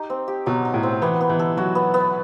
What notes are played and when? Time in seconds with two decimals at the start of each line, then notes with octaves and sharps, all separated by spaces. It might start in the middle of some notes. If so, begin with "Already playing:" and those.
Already playing: D#4 G4
0.10 C4
0.28 G4
0.46 B2 F#3
0.65 D#4
0.74 A2
0.83 C4
1.02 E3 B3
1.21 B3
1.30 E3
1.39 A4
1.57 F#3 F#4
1.75 B3
1.94 B3